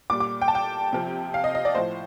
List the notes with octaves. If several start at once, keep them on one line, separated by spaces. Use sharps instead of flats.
A#2 G3 D6
D6
G5
A5
G5
C3 F3
F5
D#5
D#5
D5
A2 F3 C5